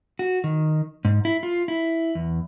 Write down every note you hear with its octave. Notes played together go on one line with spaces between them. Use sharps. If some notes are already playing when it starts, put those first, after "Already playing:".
F#4
D#3
G#2
E4
F4
E4
E2